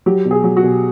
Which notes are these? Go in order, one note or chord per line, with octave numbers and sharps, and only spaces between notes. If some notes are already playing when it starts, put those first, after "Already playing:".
F#3 G4
B2
G#4
F#3
F#4
B2